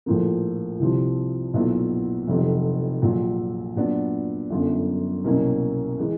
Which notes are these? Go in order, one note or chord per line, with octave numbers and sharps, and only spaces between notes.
A#1 A2 F3 A#3
C2 C3 F3
B1 A#2 F#3 B3 E4
F1 F2 C3 D#3 F#3
A#1 A#2 F#3
A#2 F#3 B3 D4
G1 F#2 D3
C2 B2 F#3 A#3 C#4
E3 G#3